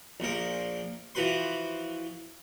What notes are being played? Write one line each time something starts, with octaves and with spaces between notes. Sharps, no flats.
A#1 A#2 F3 A#4
E3 F3 F#4 B4 C6